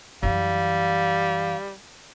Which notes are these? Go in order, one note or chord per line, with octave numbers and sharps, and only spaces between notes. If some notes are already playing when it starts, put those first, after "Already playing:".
F#2 E3 G3 F5